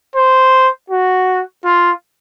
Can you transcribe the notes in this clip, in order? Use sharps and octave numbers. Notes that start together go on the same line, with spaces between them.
C5
F#4
F4